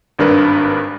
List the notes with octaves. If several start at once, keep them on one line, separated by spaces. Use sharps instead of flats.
G#1 G2 D4 A#4 B4